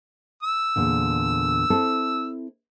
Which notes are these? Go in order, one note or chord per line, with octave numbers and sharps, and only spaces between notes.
E6
E2 A#2 D3
C4 E4 A4